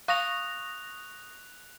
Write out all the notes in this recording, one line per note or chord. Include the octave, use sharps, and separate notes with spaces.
F5 C#6 D#6 F#6 A#6 F7